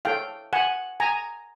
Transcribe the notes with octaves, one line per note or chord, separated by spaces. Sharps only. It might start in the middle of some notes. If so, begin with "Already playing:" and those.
E4 A4 C#5 F5 G5
F#5 G#5
G#5 A#5